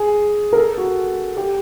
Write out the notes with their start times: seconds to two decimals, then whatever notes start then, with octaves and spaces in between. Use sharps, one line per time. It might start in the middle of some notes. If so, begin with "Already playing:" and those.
Already playing: G#4
0.53 A#4
0.57 A4
0.78 F#4
1.37 G4